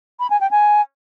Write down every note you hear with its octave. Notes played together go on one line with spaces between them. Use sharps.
B5
G#5
G5
G#5